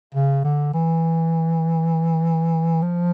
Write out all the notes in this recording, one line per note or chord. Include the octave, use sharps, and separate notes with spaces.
C#3
D3
E3
F3